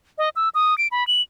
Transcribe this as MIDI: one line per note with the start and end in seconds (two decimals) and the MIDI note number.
0.18 0.29 75
0.36 0.49 88
0.55 0.77 87
0.78 0.88 98
0.92 1.06 83
1.07 1.22 102